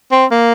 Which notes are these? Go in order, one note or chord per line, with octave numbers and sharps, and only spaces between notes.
C4
A#3